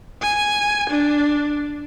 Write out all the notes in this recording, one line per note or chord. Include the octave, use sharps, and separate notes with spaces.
G#5
D4